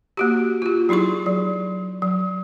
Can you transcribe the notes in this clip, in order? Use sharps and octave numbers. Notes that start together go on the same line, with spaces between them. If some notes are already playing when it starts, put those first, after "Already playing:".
A#3 F#4 G4
F4 G4
F#3 D#4 E4 G#4 C#6
F#3
F#3